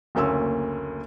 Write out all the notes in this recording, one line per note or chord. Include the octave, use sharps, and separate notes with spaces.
F#1 D2 A#3 C#4 E6